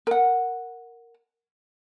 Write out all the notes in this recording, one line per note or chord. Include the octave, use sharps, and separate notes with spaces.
A#4 F#5